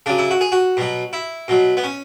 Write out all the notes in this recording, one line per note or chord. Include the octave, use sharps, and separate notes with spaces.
C#3 F#3 D4
E4
F#4
G#4
F#4
B2 F#3
E4
B2 F#3
B3
C#4